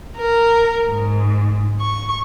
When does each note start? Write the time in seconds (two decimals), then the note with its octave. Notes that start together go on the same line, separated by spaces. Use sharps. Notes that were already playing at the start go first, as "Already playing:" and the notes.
0.16 A#4
0.88 G#2
1.81 C#6